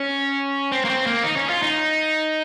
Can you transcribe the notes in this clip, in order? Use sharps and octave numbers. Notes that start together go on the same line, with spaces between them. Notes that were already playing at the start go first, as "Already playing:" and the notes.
Already playing: C#4
C4
A#3
C4
A#3
D#4
C#4
F4
D#4